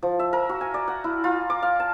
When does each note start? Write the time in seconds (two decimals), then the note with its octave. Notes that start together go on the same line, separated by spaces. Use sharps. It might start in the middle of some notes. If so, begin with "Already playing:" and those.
0.03 F3
0.19 E5
0.33 A#4
0.49 F#4
0.61 G#5
0.74 D5
0.88 F#5
1.04 E4
1.24 F4
1.50 D6
1.63 F5
1.80 A5